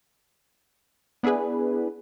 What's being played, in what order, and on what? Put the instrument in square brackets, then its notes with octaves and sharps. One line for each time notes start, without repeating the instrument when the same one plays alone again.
[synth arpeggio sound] B3 D4 E4 G#4 B4